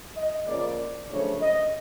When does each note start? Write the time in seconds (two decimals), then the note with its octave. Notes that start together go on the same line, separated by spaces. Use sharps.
0.16 D#5
0.47 C#3 F3 A#3 C#4 D5
1.09 F#2 C#3 F3 A3 D4 C#5
1.41 D#5